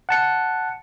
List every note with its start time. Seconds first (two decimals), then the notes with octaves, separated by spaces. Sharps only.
0.09 F#5 A5 C#7